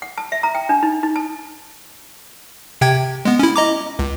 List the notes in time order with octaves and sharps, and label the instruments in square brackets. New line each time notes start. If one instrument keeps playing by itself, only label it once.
[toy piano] F#5
A5
E5
A#5
G5
D4
D#4
D#4
A5
[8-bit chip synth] C3 G5 G#6
G#3 B3
C#4 E4
D#5 A#5 D6
C#2